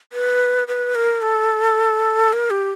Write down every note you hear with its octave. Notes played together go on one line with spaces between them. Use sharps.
B4
B4
A#4
A4
A#4
G4